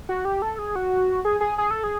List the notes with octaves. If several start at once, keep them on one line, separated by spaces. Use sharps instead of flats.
F#4
G4
A4
G#4
F#4
G#4
G#4
G#4
A4
G#4